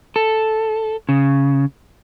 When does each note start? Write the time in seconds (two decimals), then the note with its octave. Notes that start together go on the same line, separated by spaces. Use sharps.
0.16 A4
1.09 C#3